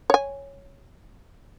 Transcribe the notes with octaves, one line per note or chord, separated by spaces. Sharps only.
C#5 G#5